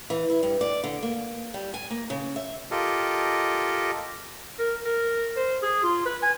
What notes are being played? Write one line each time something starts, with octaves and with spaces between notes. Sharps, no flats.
E3
E4
G2
D5
D3
A#3
G3
G#5
A#3
C#3
E5
F4 G4 A4 A#4 D#5
A#4
A#4
C5
G#4
F4
B4
G#5